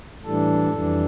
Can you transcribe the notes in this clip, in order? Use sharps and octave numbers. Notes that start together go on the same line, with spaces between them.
A2 E3 G3 D4 A4
F2 E3 G3 D4